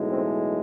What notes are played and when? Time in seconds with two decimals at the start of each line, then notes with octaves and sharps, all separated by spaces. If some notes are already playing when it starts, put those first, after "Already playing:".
Already playing: B1 A2 E3 G#3
0.09 C4